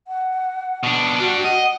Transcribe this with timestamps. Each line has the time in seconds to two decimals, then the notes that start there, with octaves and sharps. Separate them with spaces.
0.08 F#5
0.83 B2 D4
1.20 G3 D4 F#4
1.44 D#5 F#5